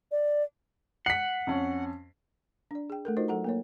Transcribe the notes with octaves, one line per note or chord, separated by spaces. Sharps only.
D5
F#5 B6 C7
F2 C#4
D4 D5
G#4 G5
A3 A4 A#4
D#4 F4 F#4 A#4 C5 D#5
F#3 A4 F#5 A#5
A#3 A#4 C#5